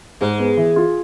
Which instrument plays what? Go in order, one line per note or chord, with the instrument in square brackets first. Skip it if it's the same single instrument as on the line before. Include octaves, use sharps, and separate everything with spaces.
[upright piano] G#2 [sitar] G#3
[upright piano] B3
E3
F4